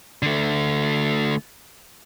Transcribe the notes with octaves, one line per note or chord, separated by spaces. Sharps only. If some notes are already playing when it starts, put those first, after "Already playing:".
D3 A3